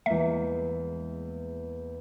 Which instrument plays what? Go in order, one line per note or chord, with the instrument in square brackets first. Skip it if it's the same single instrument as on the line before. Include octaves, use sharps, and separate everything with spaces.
[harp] E2 G#3 A#3 [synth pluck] E5